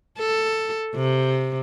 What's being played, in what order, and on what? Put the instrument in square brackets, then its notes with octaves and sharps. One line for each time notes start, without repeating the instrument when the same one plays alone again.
[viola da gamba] A4
C3